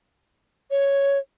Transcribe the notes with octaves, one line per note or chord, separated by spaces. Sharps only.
C#5